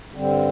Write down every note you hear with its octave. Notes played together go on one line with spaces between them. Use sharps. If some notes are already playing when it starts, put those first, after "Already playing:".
G2 D3 G3 C4